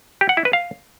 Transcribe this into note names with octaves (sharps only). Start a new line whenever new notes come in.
G4
F#5
E4
B4
F5